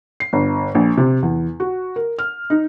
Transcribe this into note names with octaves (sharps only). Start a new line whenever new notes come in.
C7
G1
A#1
C3
E2
F#4
A#4
F6
D#4